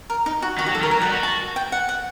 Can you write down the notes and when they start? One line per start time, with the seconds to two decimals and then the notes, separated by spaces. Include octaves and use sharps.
0.10 A#4
0.26 D#4
0.42 F#4
0.58 D#3 F#4
0.66 G4
0.69 F#3
0.75 A4
0.81 D#3 A#4
0.91 F#3 A#4
1.01 G3 F#5
1.08 D#4
1.13 F#4
1.23 A5
1.56 G5
1.72 F#5
1.89 F#5